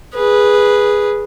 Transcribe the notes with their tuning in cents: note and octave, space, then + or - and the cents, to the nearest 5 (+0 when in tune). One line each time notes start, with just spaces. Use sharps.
G#4 -5 B4 -10